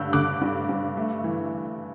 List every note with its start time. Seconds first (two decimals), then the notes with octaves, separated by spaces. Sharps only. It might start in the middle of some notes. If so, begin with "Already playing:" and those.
Already playing: G2 D3 G3 E6 G6
0.13 D3 D6 F#6
0.42 G2
0.69 G2
0.97 A3
1.24 E3